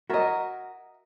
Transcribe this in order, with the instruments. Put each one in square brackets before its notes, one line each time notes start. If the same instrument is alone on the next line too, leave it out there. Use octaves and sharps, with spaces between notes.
[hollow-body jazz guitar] F#4 A#4 [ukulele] D#5 E5